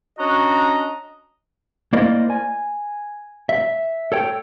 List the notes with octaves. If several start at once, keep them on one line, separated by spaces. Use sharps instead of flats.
C#4 D4 F#4 D#5 A#5
A#3 E4 A#4 C5 D5 D#5
G#5
E5
A4 C#5 G5